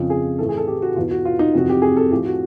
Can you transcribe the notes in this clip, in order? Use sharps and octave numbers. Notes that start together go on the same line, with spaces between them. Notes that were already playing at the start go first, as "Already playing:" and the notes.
Already playing: F2 C#3 F3
G#4
A2 E3 A4
G#4
A4
G4
F#4
E2 B2 F4
F#4
F4
D#4
F2 C3 E3 F#4
G4
G#4
A4
A2 F3 G4
F#4